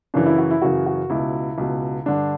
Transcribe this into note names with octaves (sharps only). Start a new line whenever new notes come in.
F#2 C#3 E3 D4
E4
F#4
E4
F#2 C#3 E3 F#4
F#4
C#2 B2 E4
C#2 B2
G2 D3 D4